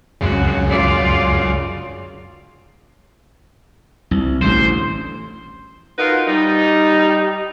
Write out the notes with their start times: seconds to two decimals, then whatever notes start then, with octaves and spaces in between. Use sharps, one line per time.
0.21 C#2 F#2 C#3 F#4
0.68 F4 D5
4.11 C2
4.41 A1 D2 C5
5.99 D#4 F4 F#4 A#4 B4 D#5
6.28 G3 D#4